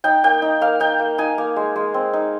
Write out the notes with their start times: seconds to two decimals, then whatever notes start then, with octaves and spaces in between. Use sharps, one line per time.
0.04 D#4 G5
0.24 A#3 G5
0.42 D#4
0.61 A#3 F5
0.80 D#4 G5
1.00 A#3
1.18 D#4 G#5
1.38 A#3
1.56 G#3
1.76 G#3
1.94 C4
2.13 D#4